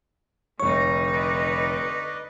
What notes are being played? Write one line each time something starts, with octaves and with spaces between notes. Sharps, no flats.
F1 D3 D#4 C#5 C#6
B4 D5 D#5